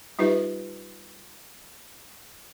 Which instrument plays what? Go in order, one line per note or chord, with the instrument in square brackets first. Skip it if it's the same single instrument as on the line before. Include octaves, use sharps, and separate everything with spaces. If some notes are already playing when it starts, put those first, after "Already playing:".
[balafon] G3 D#4 F4 G4 B4 E5